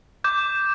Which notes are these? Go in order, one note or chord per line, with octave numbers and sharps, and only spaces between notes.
D6 G6